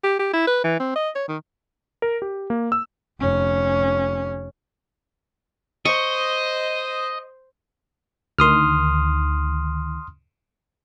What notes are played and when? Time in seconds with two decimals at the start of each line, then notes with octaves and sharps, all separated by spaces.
0.04 G4
0.19 G4
0.33 E4
0.47 B4
0.64 E3
0.80 C4
0.96 D#5
1.15 C#5
1.28 D#3
2.02 A#4
2.22 G4
2.50 A#3
2.72 E6
3.20 F1 C#4
5.85 C5 D#5 C#6
8.39 D2 D#3 C6 D#6 F6